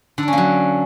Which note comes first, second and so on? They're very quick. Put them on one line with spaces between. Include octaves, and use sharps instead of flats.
D3 D4 C#4 A#3 F#3